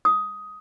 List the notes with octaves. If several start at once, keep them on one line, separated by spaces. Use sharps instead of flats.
D#6